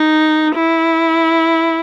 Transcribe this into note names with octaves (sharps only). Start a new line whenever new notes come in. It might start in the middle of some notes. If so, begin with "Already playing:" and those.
Already playing: D#4
E4